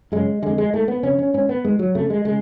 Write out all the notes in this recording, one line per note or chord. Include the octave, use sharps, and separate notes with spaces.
F#2 C#3 G#3
F2 D3 G#3
G#3
G#2 A3
B3
F2 C#3 C#4
C#4
G#2 C#4
B3
G#2 G#3
F#3
F2 C#3 A3
G#3
C#3 G#3